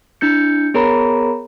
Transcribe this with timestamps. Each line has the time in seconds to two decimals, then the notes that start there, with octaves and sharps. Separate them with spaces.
0.21 D4 E4 G6 C#7
0.74 B3 G#4 A#4 C#5 A#5 B5